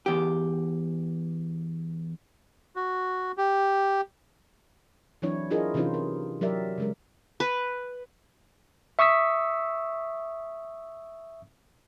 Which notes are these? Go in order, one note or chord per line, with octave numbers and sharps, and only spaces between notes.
E2 G4
F#4
G4
E3 F#3 C4 D4 E4 C#5
D4 E4 F4 G#4 A#4 D#5
C3 E3 C#4 D#4 F4 C5
A#4
F#3 G4 A#4 D5 E5
C#3 G#3 A#4
B4
E5 C#6 D#6 E6 B6